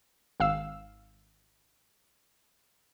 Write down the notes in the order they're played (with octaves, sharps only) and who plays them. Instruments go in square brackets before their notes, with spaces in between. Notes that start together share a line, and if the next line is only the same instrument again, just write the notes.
[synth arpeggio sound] G#1 F5 E6